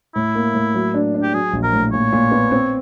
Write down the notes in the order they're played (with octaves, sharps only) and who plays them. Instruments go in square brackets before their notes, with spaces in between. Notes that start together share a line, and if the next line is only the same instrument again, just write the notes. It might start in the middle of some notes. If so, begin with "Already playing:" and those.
[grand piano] A2 [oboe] E4
[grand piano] A#3
A2
F#3
D4
D4
[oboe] G4
[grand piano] F#3 [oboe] G#4
[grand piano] A#1
[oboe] A#4
[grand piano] A2
[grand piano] A#2 [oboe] C#5
[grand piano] A#2
B3
C4